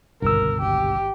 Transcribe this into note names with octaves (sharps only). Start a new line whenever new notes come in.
G#1 C#2 G2 B2 D3 A#4 E6
G#1 G4